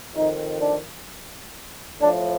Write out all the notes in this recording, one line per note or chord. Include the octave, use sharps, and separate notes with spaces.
F2 D#3 D#4
D4
A2 F3 D4